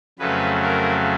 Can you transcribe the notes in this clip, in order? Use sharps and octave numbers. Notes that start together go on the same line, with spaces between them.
F2 C#3 F#3 A3 B4
A#4